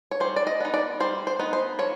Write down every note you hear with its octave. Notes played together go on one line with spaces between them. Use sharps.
C#5
G3 C5
D5
D#5
B3 D#4
D5
G3 C5
C5
B3 D#4
C5
F3 C#5